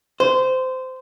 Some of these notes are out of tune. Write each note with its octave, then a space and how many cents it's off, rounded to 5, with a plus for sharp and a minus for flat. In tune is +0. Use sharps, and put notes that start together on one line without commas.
C5 -20